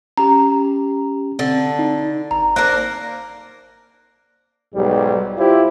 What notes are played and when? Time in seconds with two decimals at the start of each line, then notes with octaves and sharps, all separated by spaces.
0.17 C#4 G4 A#5
1.39 D3 C4
1.79 D#4
2.31 G#1 A#5
2.56 A#3 D4 A#4 C5 F#6
4.74 B1 G#2 G3
5.38 E4 F4 G4 C5